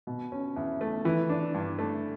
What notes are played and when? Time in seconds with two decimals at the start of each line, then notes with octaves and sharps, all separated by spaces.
0.07 B2
0.32 C#4
0.56 E2
0.81 A3
1.05 E3
1.29 D4
1.54 G2
1.79 A3